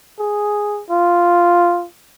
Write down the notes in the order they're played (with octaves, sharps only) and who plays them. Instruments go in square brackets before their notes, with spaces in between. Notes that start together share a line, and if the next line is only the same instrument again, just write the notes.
[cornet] G#4
F4